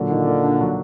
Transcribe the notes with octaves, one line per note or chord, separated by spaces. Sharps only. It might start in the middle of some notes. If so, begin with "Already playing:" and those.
Already playing: A#2 D3 F#3
D#3
A#3
D4
F#3